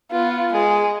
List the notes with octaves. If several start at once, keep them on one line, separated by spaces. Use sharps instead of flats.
B3 F4
G#3 G#4